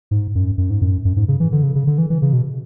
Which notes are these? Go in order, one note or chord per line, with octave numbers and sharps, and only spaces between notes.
G#2
F#2
F#2
G#2
F#2
F#2
G#2
C#3
E3
D3
C#3
C#3
D3
E3
E3
C#3
B2